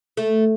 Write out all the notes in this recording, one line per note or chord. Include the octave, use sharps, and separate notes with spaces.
A3